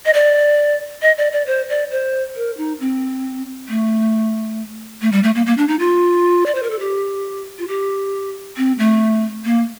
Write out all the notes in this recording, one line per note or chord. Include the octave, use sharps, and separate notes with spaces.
D#5
D5
D#5
D5
D5
C5
D5
C5
A#4
D#4
C4
A3
A3
G3
A3
A#3
A#3
D4
D#4
F4
D5
C5
A#4
A4
G4
F4
G4
C4
A3
A#3